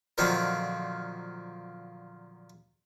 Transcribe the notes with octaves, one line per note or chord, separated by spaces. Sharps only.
A#2 D3 D#3 F3 F#3 C4